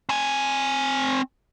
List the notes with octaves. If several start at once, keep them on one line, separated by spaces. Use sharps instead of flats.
C4 G#5